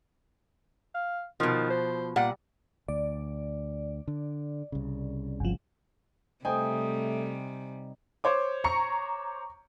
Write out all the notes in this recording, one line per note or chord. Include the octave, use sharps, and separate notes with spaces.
F5
B2 D#3 F3
C5
A#2 G3 F#5
D2 D5
D3
C2 C#3
G1 F3
C3 G3 A3 D#4 C5 G5 G#5
C5 C#5 D6
A#5 C#6 C#7